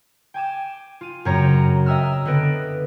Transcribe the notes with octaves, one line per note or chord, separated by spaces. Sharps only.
G5 G#5 D6 E7
F4 D#7
F#2 C#3 C4 C#5 A#5 D7
D#5 E5 G5 E6 F6
D3 B3 B4 A#6 D7 E7